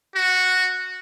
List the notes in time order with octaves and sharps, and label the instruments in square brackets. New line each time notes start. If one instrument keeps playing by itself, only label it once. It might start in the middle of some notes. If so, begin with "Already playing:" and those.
[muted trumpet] F#4